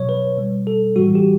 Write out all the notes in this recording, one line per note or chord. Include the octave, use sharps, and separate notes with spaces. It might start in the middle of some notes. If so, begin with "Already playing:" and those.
Already playing: B2 F#3 C#5
B4
B2 G3
A4
A2 E3 G3 F#4
G4